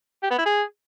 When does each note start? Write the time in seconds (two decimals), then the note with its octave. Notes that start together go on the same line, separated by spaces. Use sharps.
0.23 G4
0.30 B3
0.38 E4
0.46 G#4